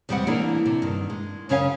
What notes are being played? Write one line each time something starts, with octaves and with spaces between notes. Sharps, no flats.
E2 C3 G3 G#3 C4 F#5
E3 A#3 D4 G#4 D5
C3
G2 D#3
G#3
F#2 C#3 C#4 C#5 F5 G#5